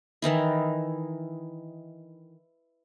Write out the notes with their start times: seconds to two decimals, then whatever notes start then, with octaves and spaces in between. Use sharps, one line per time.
0.22 D#3 E3 D#4 E4